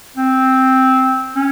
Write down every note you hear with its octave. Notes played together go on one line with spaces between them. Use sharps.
C4
C#4